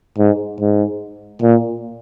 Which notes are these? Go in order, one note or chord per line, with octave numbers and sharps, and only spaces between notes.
G#2
G#2
A#2